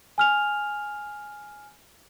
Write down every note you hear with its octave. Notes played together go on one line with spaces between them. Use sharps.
G#5 F6 F7